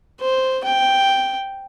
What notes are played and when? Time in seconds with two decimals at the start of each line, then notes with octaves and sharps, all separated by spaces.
0.21 C5
0.64 G5